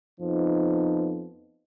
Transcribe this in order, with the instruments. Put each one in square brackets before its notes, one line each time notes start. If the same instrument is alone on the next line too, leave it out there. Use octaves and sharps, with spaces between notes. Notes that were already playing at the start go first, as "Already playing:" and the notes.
[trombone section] F2 F3 B3 D#4